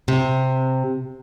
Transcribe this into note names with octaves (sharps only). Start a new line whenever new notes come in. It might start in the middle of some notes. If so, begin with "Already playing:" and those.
C3